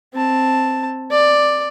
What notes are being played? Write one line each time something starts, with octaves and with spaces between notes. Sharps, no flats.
C4 A5
D5